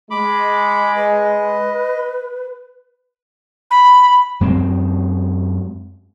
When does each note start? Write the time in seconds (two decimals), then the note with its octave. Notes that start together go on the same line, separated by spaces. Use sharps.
0.11 G#3 B5 D6
0.96 B4 D#5
3.71 B5
4.41 F#2 G#3 C4